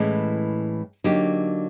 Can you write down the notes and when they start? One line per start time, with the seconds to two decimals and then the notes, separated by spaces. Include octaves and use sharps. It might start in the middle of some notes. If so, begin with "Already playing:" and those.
Already playing: A2 E3 G#3 C#4
1.04 D3 F#3 A#3 D#4 G4